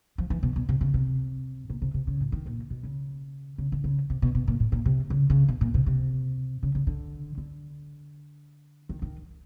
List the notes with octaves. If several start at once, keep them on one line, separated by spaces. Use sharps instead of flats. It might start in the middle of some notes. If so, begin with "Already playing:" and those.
F3
E3
B2
B2
C3
C#3
C3
A#2
C3
C3
C#3
A2
D#3
A#2
B2
C#3
C#3
D3
C#3
C3
B2
B2
A#2
A2
A#2
C3
C#3
C#3
B2
A#2
C3
C3
C#3
C#3
D3
D3
D#3
D#3